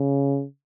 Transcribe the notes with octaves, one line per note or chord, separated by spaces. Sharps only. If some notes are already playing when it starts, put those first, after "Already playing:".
Already playing: C#3